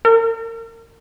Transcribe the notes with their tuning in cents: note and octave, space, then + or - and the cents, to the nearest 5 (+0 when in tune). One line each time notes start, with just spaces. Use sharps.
A#4 -35